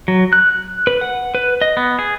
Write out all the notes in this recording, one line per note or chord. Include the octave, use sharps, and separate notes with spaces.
F#3
F#6
B4
F#5
B4
D#5
B3
G#4